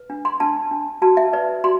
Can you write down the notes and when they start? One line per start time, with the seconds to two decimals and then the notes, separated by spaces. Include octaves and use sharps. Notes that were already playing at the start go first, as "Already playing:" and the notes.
Already playing: B4
0.10 D4
0.25 C6
0.40 D4 A5
0.71 D4
1.02 F#4 A5
1.17 E5
1.33 B4 D5
1.64 F#4 C6